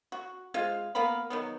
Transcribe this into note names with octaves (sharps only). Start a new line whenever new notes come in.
F#4
G#3 F4 C5 F5
A#3 B3 F5 B5
D#3 F#3 B3